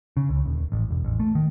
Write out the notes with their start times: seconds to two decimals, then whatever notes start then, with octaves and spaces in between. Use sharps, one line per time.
0.17 C#3
0.29 C#2
0.46 D#1
0.72 A1
0.90 E1
1.05 A1
1.20 A3
1.35 D#3